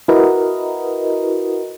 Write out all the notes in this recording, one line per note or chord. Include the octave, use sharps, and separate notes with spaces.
E4 F#4 A#4 B4 D#5